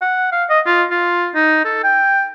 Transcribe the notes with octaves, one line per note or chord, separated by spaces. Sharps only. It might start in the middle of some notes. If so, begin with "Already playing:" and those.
F#5
F5
D#5
F4
F4
D#4
A4
G5